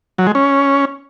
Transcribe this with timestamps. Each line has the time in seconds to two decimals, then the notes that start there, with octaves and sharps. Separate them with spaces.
0.18 F#3
0.27 G#3
0.35 C#4